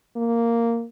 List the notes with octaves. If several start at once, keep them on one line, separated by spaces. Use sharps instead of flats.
A#3